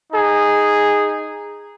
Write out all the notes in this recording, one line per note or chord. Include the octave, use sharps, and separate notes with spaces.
D#4 G#4